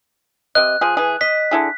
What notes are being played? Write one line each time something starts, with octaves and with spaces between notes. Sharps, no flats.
C3 D#5 F#6
F3 G#4
E3 G#4
D#5 B6
D3 E4 G#4